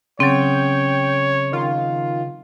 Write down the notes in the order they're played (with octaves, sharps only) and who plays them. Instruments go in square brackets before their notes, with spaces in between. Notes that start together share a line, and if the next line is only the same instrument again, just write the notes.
[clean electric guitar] C#3 [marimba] F#3 C4 [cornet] C#5 [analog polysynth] G5
[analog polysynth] D#3 F4